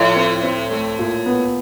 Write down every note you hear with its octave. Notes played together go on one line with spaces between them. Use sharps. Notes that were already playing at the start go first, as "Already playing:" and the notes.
Already playing: A2 F3
C4
C4
A3
A#2
B3